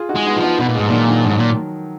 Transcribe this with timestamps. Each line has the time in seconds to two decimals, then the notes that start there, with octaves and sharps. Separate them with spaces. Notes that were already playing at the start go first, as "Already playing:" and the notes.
Already playing: F4 G#4
0.09 D#4 F#4
0.15 G#3
0.26 B3 D#4
0.37 F3
0.43 B3 D#4
0.59 B2 B3 D#4
0.69 A#2
0.75 G#2 F3 G#3
0.88 A#2 D#3 F#3
1.09 D#3 F#3
1.19 F3
1.25 G#2 D#3 F#3
1.37 A#2